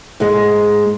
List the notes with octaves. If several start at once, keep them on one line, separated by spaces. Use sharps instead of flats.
G#2 G#3